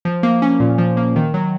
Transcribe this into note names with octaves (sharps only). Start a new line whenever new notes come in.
F3
A#3
C#4
A#2
F3
A#3
D#3
F#3